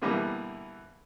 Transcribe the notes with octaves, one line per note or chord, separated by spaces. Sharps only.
B2 D3 E3 G3 A#3 B3